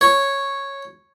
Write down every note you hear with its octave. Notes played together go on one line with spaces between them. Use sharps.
C#5